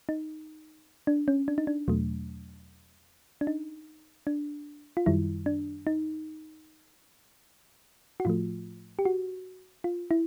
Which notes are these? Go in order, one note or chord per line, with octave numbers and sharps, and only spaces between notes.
D#4
D4
C#4
D4
D#4
D4
E2 B2 F#3 A3
D4
D#4
D4
F4
F#2 D#3 G3 E4
D4
D#4
F#4
A2 F3 A3 F4
G4
F#4
F4
E4